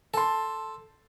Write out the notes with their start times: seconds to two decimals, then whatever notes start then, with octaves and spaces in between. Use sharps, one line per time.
0.14 A4 A5 C6